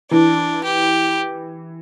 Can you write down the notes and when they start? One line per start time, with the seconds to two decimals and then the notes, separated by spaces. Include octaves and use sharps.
0.11 E3 D4
0.64 G4